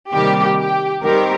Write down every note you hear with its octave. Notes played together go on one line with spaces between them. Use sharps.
C3 D#3 G3 A#3 G4
G4
D#3 G3 C4 G4 A#4